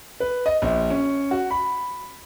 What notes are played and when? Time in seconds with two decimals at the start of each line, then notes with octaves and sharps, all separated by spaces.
0.20 B4
0.46 D#5
0.62 A#1
0.90 C#4
1.31 F#4
1.51 B5